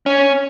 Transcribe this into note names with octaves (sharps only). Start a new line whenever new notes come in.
C#4